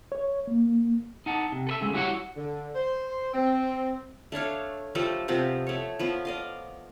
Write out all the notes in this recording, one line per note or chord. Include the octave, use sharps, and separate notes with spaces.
C#5
A#3
D#4 F#5 A5
C3
A4 B4 E5
C#3 G#3 A3 B3
G3 E4 F#4 B4 C#5 F#5
D3
C5
C4
A3 D4 C#5 F5
F3 G3 A3 A4
C3 F3 B3 C4
A3 C#5
F3 B3
D5 D#5 F5